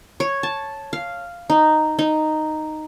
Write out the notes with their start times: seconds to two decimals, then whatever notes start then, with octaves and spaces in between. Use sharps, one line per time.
0.20 C#5
0.43 A5
0.93 F5
1.50 D#4
1.99 D#4